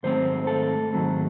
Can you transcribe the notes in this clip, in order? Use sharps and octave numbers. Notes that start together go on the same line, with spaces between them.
G#2 D#3 F#3 A3 C4 C5
A4
G#2 D#3 F#3 A3 C4